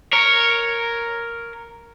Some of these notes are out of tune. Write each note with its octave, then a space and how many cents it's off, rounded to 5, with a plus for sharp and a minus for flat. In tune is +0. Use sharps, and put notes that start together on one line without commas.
A#4 +0 C#5 +0